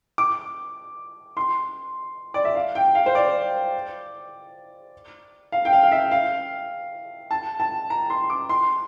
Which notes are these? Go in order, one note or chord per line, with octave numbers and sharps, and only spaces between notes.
D6
C6
D5
E5
F5
G5
F5
C5
D5
F5
G5
F5
F5
E5
F5
A5
A5
A#5
C6
D6
C6